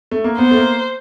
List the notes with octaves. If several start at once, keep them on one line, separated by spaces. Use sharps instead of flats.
A3
A#3
B3 C5
A3
A#3